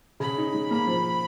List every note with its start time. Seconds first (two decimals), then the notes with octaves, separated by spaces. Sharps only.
0.20 C#3 B5
0.38 D#4
0.54 G#3
0.70 A#3 B5
0.87 F3